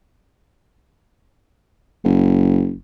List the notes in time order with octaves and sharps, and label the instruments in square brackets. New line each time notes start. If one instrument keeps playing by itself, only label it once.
[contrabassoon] F#1